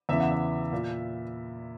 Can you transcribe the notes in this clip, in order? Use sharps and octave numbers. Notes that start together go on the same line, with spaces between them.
E2 C#3 E3 E5
F#5
E5
A#2